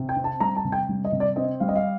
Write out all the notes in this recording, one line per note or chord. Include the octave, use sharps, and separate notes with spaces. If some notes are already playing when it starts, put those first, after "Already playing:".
Already playing: C3
G5
C4
A5
G3 A#5
A5
C3
G5
G3
D#5
C3
D5
C4 D#5
G3 F5
D#5
F5